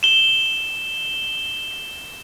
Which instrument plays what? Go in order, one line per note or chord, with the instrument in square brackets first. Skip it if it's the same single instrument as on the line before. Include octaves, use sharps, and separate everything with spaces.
[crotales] E7 G7